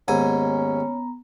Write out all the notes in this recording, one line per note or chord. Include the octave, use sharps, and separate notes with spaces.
D#2 G#2 B3 C#4 G#5 A#5